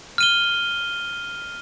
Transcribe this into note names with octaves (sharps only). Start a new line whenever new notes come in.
F6 D#7 G7